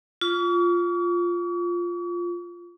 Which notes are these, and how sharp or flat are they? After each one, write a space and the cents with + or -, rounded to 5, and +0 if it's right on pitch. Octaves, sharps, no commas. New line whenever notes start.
F4 +0 C#6 +45